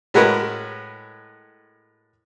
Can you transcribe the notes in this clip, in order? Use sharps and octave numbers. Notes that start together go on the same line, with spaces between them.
A2 G#3 F#4 A#4 B4